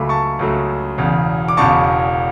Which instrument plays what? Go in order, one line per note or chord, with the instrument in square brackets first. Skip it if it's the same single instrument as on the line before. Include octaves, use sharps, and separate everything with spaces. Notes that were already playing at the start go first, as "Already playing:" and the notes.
Already playing: [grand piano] C#2 C#3 F#3 A3 B5 D6
A5 C#6
C#2 C#3 F#3 A3
E1 E2 C#3
D6
E1 E2 C#3 A5 C#6